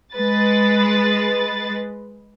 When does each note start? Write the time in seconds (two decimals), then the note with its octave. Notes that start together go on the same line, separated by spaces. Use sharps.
0.14 G#3 B4 A6